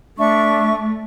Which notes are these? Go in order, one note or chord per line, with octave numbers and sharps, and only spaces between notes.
A3 D4 E5 C#6